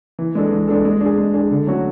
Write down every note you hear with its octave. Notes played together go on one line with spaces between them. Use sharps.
E3
G#3 D4 A4
E3
G#3 D4 A4
G#3
D4
G#4
G#3
D4 G#4
D3
F#3 A3 C#4 F#4